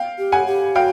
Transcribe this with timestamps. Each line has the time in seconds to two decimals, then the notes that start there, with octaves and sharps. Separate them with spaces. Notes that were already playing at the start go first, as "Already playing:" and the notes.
Already playing: F5 G5
0.18 G4
0.32 F#5 G#5
0.47 G4
0.75 F#4 F5 G5